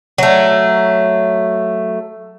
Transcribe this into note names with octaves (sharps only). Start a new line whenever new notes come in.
F#3 A3